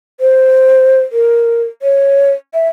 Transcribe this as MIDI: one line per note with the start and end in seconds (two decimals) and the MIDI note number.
0.20 1.01 72
1.12 1.64 70
1.82 2.32 73
2.54 2.68 76